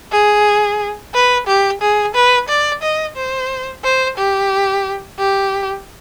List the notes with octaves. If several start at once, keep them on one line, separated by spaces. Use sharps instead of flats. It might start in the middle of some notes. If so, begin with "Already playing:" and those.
G#4
B4
G4
G#4
B4
D5
D#5
C5
C5
G4
G4